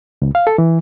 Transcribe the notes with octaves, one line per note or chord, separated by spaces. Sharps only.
C#2
F5
A4
E3